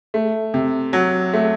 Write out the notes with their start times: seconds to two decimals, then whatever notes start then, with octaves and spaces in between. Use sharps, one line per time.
0.14 A3
0.54 C3
0.93 F#3
1.33 A3